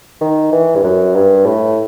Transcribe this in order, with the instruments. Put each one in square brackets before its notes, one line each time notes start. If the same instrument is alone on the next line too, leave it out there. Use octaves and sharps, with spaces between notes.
[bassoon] D#3
E3
G2
F#2
G2
A2